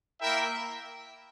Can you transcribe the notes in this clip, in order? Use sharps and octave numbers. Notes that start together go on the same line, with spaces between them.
A#3 E4 A#4 E5 G5